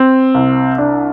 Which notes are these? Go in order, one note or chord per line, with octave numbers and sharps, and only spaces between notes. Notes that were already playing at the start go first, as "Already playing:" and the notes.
Already playing: C4
C2
D4